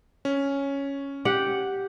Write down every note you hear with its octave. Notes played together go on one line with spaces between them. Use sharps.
C#4
G4 F#5